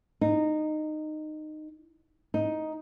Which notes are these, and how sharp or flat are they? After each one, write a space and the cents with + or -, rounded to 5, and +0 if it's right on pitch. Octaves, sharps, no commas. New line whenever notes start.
D#4 -15
D#4 +5